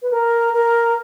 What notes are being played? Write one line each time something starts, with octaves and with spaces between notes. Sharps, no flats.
B4
A#4
A#4